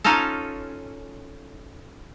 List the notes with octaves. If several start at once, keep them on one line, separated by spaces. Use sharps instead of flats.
C#4 D#4 F4 A4